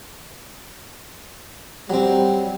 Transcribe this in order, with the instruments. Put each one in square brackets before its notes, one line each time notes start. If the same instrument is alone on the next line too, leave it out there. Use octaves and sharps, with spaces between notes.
[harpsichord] F#3 C4 [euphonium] G3